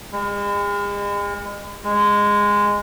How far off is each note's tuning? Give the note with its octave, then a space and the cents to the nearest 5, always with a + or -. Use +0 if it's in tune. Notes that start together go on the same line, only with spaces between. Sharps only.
G#3 -40
G#3 -15